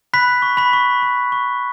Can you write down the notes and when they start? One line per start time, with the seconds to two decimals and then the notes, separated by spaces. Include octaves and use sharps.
0.13 B5 F#6 B6
0.42 C#6
0.57 B5 B6
0.73 C#6
1.02 C#6
1.32 C#6